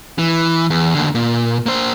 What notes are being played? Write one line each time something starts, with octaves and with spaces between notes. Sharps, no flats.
E3
E2
D#2 D3
A#2
A#3 C5